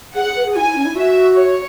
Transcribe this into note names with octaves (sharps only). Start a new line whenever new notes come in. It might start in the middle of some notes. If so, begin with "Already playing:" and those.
G#4 F#5
G#4
B4
G#4
E4 G#5
E4
C#4
E4
F#4 E5
C#5